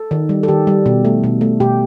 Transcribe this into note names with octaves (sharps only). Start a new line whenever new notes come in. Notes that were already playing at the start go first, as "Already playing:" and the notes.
Already playing: A4
D#3
G3
A4
D#3 G4
G3
B2
A3
B2
A3
B2 G4